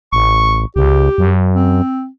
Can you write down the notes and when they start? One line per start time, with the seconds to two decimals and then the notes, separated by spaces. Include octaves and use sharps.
0.13 A1 C#6
0.76 C#2 G4
1.18 F#2
1.56 C4